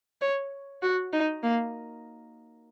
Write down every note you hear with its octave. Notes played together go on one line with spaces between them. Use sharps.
C#5
F#4
D#4
A#3